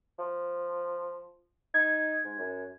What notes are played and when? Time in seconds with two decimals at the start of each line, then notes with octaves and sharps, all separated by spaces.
0.19 F3
1.74 D#4 G#6
2.25 G#2
2.39 F#2